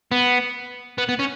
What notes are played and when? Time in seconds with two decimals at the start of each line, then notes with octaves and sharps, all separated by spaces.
0.12 B3
0.98 B3
1.09 B3
1.19 C#4